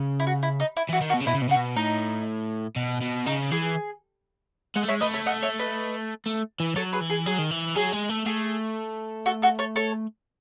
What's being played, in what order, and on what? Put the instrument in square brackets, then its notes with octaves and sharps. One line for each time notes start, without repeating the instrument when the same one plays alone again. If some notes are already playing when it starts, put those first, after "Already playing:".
Already playing: [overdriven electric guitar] C#3
[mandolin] E4
F#4
E4
D#4
E4
[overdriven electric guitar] E3 [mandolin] F#4
[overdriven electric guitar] D#3
[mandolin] F#4
[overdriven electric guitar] B2
C#3
[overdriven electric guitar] B2 [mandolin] E4
[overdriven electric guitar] C#3
B2
[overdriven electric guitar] C#3 [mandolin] F#4
[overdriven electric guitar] B2
[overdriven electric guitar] A2 [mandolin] D#4
[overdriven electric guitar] B2
B2
[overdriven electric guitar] C#3 [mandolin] D#4
[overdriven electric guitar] E3 [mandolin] G#4
[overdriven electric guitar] G#3 [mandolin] D#5 F#5
[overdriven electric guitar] A3
[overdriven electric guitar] G#3 [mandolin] C#5 E5
[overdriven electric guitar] A3 [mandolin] B4 D#5
[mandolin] C#5 E5
D#5 F#5
C#5 E5
B4 D#5
[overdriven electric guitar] A3
E3
[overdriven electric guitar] F#3 [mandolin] A4 C#5
[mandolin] G#4 B4
[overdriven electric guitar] E3
[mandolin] G#4
[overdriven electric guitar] F#3 [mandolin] G#4
[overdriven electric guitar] D#3
E3
[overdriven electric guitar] F#3 [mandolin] G#4
[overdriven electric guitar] G#3
A3
[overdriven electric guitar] A3 [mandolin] G#4
[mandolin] F#4 A4
F#4 A4
A4 C#5
A4 C#5